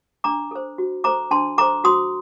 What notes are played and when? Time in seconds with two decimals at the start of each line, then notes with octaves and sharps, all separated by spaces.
0.24 D4 A#5 D6
0.51 A4 C5
0.78 F#4
1.04 A4 C5 A#5 D6
1.31 D4 A5 C6
1.58 A4 C5 A#5 D6
1.84 F#4 C6 D#6